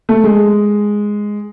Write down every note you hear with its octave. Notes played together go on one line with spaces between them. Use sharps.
A3
G#3